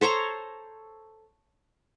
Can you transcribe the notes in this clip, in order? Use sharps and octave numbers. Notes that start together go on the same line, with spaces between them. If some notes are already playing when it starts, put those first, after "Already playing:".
A4 C5 C#5 A#5